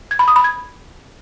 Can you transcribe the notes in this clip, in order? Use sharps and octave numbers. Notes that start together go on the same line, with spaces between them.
G#6
B5
D#6
B5
G#6